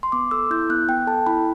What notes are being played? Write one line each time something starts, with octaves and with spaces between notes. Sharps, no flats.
C6
B3 D6
A4 E6
E4 G6
B3 F#6
B3 G5
A4 A5
E4 B5